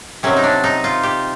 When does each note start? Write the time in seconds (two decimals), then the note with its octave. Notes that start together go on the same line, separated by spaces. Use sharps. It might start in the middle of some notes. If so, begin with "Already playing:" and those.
0.23 C3 D#3 F#3 C#4
0.36 D#4
0.44 D4
0.64 D#4
0.84 F4
1.03 G4